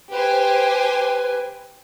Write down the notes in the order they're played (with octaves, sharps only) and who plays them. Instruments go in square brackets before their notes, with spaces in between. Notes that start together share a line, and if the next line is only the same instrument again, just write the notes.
[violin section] G4 C5 G#5 [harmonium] B4